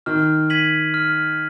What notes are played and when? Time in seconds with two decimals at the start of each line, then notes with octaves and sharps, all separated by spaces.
0.06 D#3 F6
0.50 G#6 B6 D#7 F#7
0.94 F6